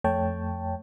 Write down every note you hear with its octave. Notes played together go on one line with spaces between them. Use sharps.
F2 A3 C#5 G5 A5